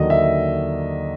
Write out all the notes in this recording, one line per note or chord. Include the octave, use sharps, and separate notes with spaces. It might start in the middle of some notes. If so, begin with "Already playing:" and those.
Already playing: D#2 D3 F#3 D#5
E5